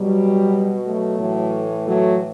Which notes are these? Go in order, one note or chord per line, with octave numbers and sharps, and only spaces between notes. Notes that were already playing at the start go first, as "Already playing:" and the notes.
Already playing: B2 F#3 G3
F#3 A3
A2 E3
F#3 A3